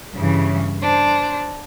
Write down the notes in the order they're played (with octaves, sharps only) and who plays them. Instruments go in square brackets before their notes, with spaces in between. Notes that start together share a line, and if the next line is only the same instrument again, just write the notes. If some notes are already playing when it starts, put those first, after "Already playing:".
[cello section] G2 C#3 E3
[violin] D4 [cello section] C5